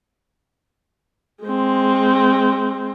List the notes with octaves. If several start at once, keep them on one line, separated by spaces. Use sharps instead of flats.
G#3 C4